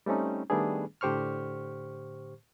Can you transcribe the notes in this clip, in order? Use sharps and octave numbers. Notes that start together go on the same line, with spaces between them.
G3 A3 C4 C#4 D#4
D#3 G3 A3 B3 D4 G#4
A2 D3 G4 C5 C#6 F6